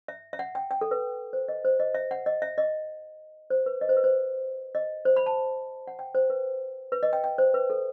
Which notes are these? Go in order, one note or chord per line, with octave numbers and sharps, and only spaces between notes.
E5
E5
F#5
G5
G5
A4
B4
C5
D#5
C5
D#5
E5
F#5
D#5
E5
D#5
C5
B4
D#5
C5
B4
C5
D#5
C5
B5
A5
F#5
G5
C5
B4
B4
D#5
G5
G5
C5
B4
A4